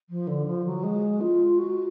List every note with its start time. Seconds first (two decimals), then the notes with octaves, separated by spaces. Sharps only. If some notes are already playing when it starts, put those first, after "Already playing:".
0.09 F3
0.27 D3
0.46 F3
0.65 F#3
0.83 G#3
1.21 F4
1.58 F#4